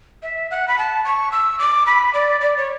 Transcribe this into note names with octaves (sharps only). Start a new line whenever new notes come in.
E5
F#5
B5
A5
C#6
E6
D6
B5
D5
D5
C#5